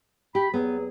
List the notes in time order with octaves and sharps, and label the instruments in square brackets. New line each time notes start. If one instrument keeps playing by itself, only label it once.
[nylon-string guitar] G4 [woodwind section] B5
[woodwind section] E2 F#3 G#4 [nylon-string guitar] B3